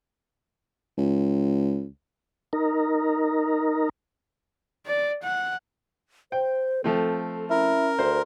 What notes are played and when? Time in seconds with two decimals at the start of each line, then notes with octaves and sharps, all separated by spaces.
0.98 C#2
2.53 D#4 A#4
4.87 D5
5.23 F#5
6.32 C5 G5
6.84 F3 A3 C4 A4
7.50 C#4 E4 A#4
7.99 D2 C5